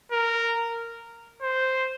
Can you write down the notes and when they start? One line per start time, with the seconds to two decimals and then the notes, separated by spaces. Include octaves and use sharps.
0.12 A#4
1.42 C5